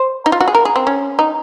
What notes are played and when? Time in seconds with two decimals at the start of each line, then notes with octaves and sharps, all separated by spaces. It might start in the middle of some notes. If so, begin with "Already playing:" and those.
Already playing: C5
0.26 D#4
0.32 F4
0.41 F#4
0.48 G#4
0.55 A#4
0.65 G#4
0.76 C4
0.87 C#4
1.19 D#4